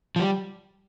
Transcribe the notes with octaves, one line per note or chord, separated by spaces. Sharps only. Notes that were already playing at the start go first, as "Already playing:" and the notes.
F3
G3